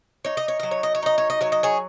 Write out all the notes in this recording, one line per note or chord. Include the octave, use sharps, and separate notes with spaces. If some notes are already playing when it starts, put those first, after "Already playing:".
D#4 C#5
D#5
C#5
F#3 D#5
C#5
D#5
C#5
D#4 D#5
C#5
D#5
F#3 C#5
D#5
G#4 C#5